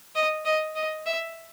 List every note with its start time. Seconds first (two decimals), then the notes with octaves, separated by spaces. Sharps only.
0.15 D#5
0.45 D#5
0.76 D#5
1.06 E5